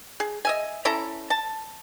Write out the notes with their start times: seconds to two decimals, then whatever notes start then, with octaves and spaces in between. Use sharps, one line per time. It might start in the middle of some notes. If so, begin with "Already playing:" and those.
0.20 G#4
0.45 D#5 E5 G#5
0.85 C#4 E4 A4 A#5
1.30 A5